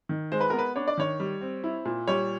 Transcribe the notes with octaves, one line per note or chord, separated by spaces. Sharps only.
D#3
G#3 C5
B4
B3 A#4
B4
D4 C#5
D5
D#3 C#5
G3
C4
E4
A#2
G3 C#5